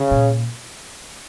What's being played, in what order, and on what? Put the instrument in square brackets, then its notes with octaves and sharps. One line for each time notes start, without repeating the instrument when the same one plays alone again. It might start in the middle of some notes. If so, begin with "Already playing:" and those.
Already playing: [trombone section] C#3
[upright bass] A#2